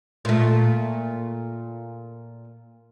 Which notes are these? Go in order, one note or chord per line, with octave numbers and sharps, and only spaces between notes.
A#2 A3